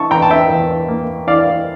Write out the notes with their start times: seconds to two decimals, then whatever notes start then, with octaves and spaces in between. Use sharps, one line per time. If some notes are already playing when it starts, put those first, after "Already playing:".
Already playing: E3 A5 C#6
0.11 E2 G5 A#5
0.22 A5
0.31 E5 G5
0.50 E2
0.88 A#3
1.27 E3 D5 F5